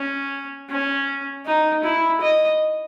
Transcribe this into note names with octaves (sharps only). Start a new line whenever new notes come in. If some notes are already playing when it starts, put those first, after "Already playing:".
Already playing: C#4
C#4
D#4
E4
D#5